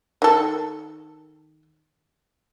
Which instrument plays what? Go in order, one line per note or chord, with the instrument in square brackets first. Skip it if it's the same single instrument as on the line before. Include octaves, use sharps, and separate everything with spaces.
[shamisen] D#3 A4